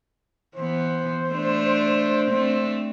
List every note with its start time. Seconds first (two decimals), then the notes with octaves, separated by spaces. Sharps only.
0.56 E3 B3 C5
1.30 A3 D4
2.30 A3 C4 D4